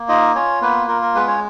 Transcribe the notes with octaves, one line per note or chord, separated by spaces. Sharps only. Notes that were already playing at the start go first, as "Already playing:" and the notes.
Already playing: A#3
D#4 F4 D#5
C#4 F4 C#5
A#3 B3 B4
F4 A#4
A#4
G#3 B3 B4
C#4 C#5